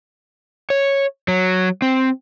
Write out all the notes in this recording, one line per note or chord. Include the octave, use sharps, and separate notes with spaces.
C#5
F#3
C4